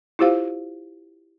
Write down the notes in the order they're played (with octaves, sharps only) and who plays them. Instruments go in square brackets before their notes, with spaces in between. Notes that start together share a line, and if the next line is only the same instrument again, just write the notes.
[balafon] E4 F4 G4 C5 F5